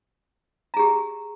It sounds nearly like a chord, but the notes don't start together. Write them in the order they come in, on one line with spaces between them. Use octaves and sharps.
A#5 G#4 G4